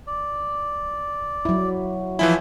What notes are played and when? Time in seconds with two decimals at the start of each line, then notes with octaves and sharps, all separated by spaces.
0.07 D5
1.45 F#3 E4
2.19 E3 F3 E4 E5 G#5